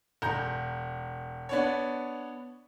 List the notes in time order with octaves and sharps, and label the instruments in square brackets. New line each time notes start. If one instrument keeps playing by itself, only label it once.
[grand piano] E1 A#5 G6
B3 D4 C#5